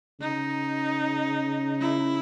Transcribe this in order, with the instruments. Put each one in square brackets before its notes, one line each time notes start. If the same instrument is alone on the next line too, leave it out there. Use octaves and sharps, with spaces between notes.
[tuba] C#3 [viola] D#4
[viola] E4